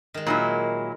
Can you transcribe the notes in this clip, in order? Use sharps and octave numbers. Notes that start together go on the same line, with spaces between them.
D#3 G#3
A#2 F#3 E4